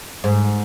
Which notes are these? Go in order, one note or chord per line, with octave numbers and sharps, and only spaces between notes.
G#2